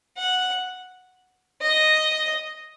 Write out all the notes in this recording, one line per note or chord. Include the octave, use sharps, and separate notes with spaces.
F#5
D#5